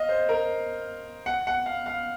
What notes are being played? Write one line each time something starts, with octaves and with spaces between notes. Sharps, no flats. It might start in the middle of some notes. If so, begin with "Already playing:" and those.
Already playing: D#5 F5
C5
A#4
F#5
F#5
F5
F5